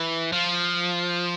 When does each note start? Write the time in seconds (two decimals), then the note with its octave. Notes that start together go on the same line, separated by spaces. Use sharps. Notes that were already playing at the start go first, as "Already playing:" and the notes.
Already playing: E3
0.32 F3